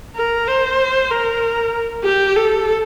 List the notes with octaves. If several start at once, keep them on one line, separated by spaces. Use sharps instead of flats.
A#4
C5
A#4
G4
A4